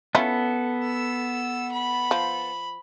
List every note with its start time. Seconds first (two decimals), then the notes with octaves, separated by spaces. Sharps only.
0.15 B3 C#4 E4 F4 A4
0.84 E6
1.72 B5
2.11 F3